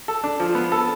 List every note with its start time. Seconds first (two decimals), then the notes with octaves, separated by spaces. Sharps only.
0.08 A4
0.24 D4
0.40 F3
0.55 B3
0.72 A4